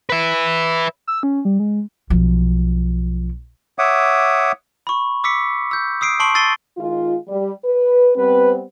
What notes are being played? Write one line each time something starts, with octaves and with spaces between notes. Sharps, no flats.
B4 E5
E6
C#4
G3
G#3
B1 F3
C#5 E5 F#5 D6 D#6
B5 C#6
D6 E6 B6 C#7
E6 G6
D#6 E6 C7 D7
A5 C6 C#6 C7 D7 F#7
E6 A6 C7 D#7 G7
D#3 G#3 F4
G3
B4
G3 B3 C4 B4